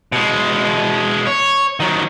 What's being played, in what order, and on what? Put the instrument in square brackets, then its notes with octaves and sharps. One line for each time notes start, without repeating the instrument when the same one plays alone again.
[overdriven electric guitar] B2 G#3
C#5
D#3 F#3